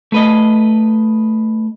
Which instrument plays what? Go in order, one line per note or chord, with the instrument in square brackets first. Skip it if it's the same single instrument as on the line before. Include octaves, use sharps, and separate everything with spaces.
[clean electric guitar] A3 B4 D#5